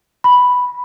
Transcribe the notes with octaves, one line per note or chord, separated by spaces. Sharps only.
B5